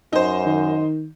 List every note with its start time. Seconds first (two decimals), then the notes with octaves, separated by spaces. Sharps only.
0.13 F#2 D#4 C5
0.45 D#3